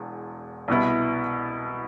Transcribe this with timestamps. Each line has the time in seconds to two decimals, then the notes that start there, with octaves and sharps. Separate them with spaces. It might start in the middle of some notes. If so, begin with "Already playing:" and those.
Already playing: E1 E2
0.68 C2 B2 B3 E4